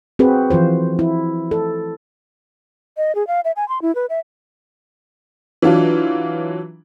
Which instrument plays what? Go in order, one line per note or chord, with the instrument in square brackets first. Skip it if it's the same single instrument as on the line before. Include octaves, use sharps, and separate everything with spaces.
[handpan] C4 F#4 G#4 B4
E3 F3 F4 C5
E4
A4
[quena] D#5
G#4
F5
E5
G#5
C6
E4
B4
E5
[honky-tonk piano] E3 F#3 D4 F4